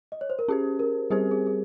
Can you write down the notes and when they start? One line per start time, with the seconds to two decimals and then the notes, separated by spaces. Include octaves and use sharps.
0.12 D#5
0.21 C#5
0.30 C5
0.39 A#4
0.48 C#4 G4 G#4 C5
0.79 A#4
1.10 G3 C4 G4 G#4 C5
1.31 G#4
1.47 G#4